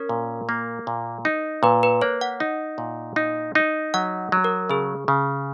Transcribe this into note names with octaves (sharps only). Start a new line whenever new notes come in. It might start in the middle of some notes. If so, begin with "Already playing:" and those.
Already playing: C#4 A#4
A#2
A#3
A#2
D#4
A#2 B4
B4
A#3 C#5
F#5
D#4
A#2
D#4
D#4
F#3 F#5
F#3
A#4
C#3 G#4
C#3